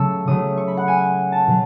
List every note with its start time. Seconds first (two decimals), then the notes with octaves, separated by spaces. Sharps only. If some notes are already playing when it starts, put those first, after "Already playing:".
Already playing: C#3 F#3 A3 A5 C#6 E6
0.28 C#3 F#3 A3 D#6
0.57 C#6
0.68 B5
0.77 F#5
0.88 G#5
1.32 A5
1.47 B2 F#3